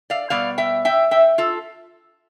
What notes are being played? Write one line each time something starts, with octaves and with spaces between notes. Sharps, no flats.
D5 F5
B2 G3 B3 D5 F5
E5 G5
E5 G5
E5 G5
F4 A4